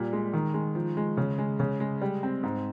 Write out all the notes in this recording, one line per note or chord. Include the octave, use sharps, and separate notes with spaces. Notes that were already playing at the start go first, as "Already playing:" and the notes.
Already playing: A#2 G3
G#3
D#3
G#3
F3
G#3
C#3
G#3
C#3
G#3
G3
C4
G#2